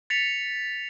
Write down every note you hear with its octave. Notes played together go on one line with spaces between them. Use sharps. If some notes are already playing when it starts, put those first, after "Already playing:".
A6 B6 C#7 F7